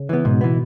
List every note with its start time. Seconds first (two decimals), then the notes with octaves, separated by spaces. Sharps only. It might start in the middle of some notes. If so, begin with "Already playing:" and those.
Already playing: C#3
0.09 E3 B3
0.25 G#2 B2
0.41 E3 B3